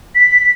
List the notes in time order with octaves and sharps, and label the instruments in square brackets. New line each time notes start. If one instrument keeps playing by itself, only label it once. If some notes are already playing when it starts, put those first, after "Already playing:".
[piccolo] B6